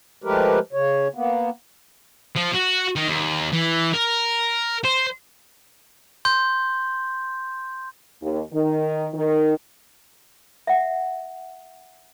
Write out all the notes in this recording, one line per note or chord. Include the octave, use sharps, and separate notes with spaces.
F3 G#3 A3 G4 A#4 B4
C#3 C#5
A#3 B3
F3
F#4
D#3
D#2
E3
A#4
C5
C6 G6
D#2
D#3
D#3
E5 F#5